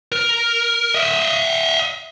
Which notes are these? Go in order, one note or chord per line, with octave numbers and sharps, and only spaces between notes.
A#4
D#5 E5